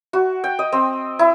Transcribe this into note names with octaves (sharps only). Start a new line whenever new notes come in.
F#4
G5
D#5
C4
E4